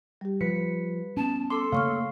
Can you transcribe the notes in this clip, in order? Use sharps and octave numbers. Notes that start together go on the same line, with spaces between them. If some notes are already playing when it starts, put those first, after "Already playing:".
G3 G4
F3 B4 B6 C#7
B3 C#4 A5
A4 C6 D6
C#3 A3 A#3 C#5 F5 C#6 F6